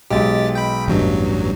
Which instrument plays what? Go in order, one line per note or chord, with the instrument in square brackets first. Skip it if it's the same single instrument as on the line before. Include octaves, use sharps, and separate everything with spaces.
[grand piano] B1 G#3 [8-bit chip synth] G4 A6
[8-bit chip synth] G5 B5
[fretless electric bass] A1 G2 [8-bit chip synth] E2 F#3